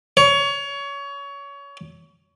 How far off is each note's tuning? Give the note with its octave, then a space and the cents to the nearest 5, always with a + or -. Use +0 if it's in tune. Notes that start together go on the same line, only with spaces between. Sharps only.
C#5 +25